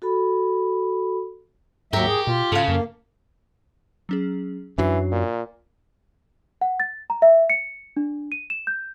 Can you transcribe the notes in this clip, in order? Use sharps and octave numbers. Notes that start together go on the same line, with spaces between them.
F#4 A4 B5
D#2 G#2 F#3 G4 A#4 E5 C#6
G#4
B2 F4
G#2 C#3 A4 F5
F#2 A#3
F#3 C#4 G#4
F#2 E3 F#3 D4 C7
A#2
F#5
A6
A#5
E5
C#7
D4
D#7
E7
G6